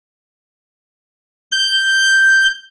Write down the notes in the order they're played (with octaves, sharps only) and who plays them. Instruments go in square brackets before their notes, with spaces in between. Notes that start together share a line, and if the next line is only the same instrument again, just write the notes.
[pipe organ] G6